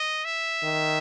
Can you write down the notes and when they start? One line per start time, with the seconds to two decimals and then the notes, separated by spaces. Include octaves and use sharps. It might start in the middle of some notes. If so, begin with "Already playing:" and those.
Already playing: D#5
0.25 E5
0.63 D#3